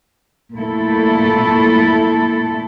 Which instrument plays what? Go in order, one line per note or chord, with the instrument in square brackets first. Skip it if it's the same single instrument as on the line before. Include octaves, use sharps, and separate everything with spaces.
[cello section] A#2 A3 E4 A4